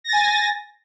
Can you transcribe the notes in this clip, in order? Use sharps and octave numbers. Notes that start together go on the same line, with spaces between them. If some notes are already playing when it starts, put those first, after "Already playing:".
G#5 A6 A#6